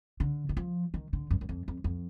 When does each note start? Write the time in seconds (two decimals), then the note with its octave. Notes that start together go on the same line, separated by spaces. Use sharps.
0.20 D3
0.49 D#3
0.57 F3
0.94 D#3
1.13 D3
1.31 F#2
1.41 F#2
1.49 F2
1.68 F2
1.84 F2